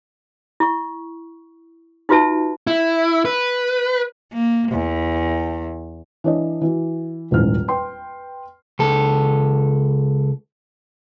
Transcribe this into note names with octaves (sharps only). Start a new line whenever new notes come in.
E4 C#6
D#4 F4 F#4 B4 E5 A5
E4
B4
A#3
E2
E3 D4 C#5 D#5
E3 F#4
D#1 A#1 E2 G#2 C#4 F6
B4 G5 C6
C#2 A4